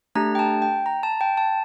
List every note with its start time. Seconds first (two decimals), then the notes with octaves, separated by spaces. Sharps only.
0.15 A3 D4 G4 A#5
0.35 G5
0.39 A5
0.62 G5
0.86 A#5
1.03 A5
1.21 G5
1.37 A5